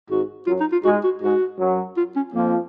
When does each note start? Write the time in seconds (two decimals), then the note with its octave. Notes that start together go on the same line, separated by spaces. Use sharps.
0.10 G#1 G#2 F#4
0.47 F#2 F#3 F4
0.60 D#4
0.72 F4
0.85 G#2 G#3 F#4
1.04 F#4
1.22 G#2 G#3 F#4
1.59 F#2 F#3
1.97 F4
2.16 C#4
2.34 F2 F3 A#3